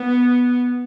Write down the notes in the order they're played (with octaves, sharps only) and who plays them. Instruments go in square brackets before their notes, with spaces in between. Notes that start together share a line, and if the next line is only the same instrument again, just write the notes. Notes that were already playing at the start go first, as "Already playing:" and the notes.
Already playing: [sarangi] B3